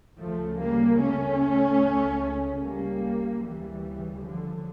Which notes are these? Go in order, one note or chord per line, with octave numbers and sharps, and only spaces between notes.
D2 C#3 F3 A3
G3 A#3
A3 C#4
C#2 C#3
G3 A#3
D2 C#3 E3 G3
D3 F3